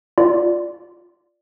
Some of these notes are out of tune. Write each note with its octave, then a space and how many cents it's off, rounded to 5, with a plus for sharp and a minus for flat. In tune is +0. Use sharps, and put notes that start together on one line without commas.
F4 +0 D5 +0